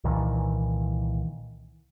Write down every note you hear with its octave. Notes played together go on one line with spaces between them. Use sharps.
C2 A#2 D#3 E3